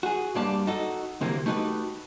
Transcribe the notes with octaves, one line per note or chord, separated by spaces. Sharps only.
F#4 G#4
G2 G3 A#3 D5 A5
D#4 F#4 A4
D2 C3 E3 A#3
A3 D#4 F#4 G4 B4